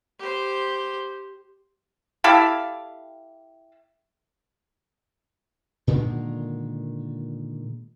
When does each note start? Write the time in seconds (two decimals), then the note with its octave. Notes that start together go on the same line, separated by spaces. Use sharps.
0.19 G4 C5
2.24 E4 G4 A4 F5
5.87 A#2 D3 D#3 G#3